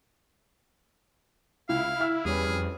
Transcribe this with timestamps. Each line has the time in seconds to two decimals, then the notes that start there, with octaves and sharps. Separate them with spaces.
1.69 C#2 E4 F5
2.00 E5 E6 F6
2.25 E2 G3 C#4 G#4 B4
2.48 F2